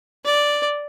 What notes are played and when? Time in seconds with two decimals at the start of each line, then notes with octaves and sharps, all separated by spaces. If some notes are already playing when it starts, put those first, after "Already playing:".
0.25 D5